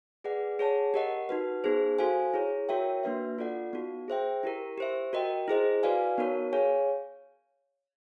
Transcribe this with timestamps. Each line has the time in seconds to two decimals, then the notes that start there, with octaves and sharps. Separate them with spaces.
0.24 G#4 B4 D5 F#5
0.59 G#4 C#5 F#5 A5
0.94 G4 A#4 D#5 F#5
1.29 D#4 F#4 B4
1.64 B3 D#4 G#4 C5
1.99 F#4 A4 C5 F5 G#5
2.34 E4 G#4 C#5
2.69 F#4 A#4 C#5 E5 G5
3.03 A#3 D4 F#4 B4 E5
3.39 F4 A4 D5 F#5
3.73 B3 D#4 F#4
4.08 G#4 C5 E5 G5
4.43 E4 G4 A#4
4.78 G4 C5 E5
5.13 F#4 A#4 D#5 G5
5.48 E4 G#4 C5 D#5
5.83 F#4 B4 D5 F5 G#5
6.18 B3 D#4 F#4 A#4 C#5
6.53 G#4 C#5 F5 G#5